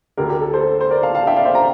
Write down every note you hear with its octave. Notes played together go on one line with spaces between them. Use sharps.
D2 D3 G4 A#4
G4 A#4
A4
A4 C5
C5
A#4 D5
F5 A5
F5 A5
E5 G5
D5 F5
C5 E5
G5 A#5